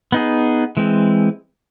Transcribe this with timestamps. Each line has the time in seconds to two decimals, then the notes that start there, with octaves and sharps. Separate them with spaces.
0.12 B3 D#4 G#4
0.77 E3 G#3 C4